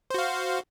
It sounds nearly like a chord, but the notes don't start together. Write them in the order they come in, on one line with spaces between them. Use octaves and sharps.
C5 F#4 F5